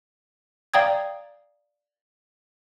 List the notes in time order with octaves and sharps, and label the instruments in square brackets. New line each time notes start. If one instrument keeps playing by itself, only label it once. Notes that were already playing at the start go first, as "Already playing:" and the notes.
[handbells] D5 F5 G5 A#5 D#6 G#6